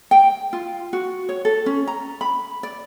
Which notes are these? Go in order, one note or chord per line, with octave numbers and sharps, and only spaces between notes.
G5
F4
F#4
C#5
A4
C#4
A#5
B5
D5